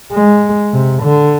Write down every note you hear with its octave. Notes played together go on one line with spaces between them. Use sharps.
G#3
C3
D3